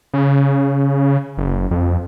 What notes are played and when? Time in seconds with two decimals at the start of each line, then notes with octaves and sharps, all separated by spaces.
0.13 C#3
1.38 F#1
1.71 F2